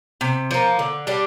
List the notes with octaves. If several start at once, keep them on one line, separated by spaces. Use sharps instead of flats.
C3
F3 A#3
D3
G3 D4 G4